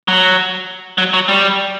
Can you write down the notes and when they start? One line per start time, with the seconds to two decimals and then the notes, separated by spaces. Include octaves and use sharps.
0.08 F#3
0.98 F#3
1.14 F#3
1.28 G3